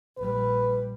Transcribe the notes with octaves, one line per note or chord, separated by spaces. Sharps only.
A#1 G3 B4